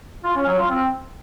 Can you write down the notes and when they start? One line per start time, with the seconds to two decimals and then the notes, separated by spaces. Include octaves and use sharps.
0.24 F4
0.35 C#4
0.47 F#3
0.58 F4
0.69 C4